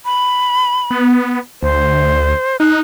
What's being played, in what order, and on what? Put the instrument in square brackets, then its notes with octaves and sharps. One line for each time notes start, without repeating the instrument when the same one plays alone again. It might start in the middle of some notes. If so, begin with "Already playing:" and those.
[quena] B5
[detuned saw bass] B3
[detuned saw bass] D2 [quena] C5
[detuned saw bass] D#4 [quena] F#6